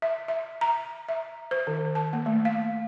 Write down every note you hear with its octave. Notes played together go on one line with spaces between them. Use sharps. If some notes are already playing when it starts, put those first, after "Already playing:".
E5
E5
A#5
E5
C5
D#3
A5
A#3
A3
F5